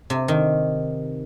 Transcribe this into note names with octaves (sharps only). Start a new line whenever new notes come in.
C3
D#3